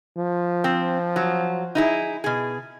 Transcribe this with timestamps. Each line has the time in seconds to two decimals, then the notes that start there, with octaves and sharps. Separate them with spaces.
0.17 F3
0.64 C4
1.16 F#3
1.75 D#4 E4 G#4
2.24 B2 G#4